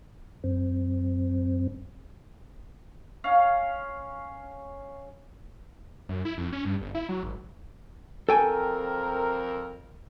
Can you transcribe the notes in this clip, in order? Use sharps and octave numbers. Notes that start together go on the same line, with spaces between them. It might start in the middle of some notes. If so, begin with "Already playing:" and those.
F#2 C4
C#4 F5
F#2
E4
F2
C#4
G2
G1
E4
F#3
G#1
F2 C4 A4 A#4 G5 G#5